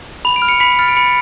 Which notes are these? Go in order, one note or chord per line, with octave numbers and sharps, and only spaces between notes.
B5 F7
D7
F6
C#7
B5 B6
F6 A6
D7
B5 C#7